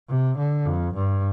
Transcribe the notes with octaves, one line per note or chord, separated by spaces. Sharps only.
C3
D3
F2
G2